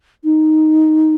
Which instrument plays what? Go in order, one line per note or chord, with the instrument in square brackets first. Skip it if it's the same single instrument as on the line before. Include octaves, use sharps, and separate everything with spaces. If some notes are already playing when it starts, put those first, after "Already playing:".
[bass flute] D#4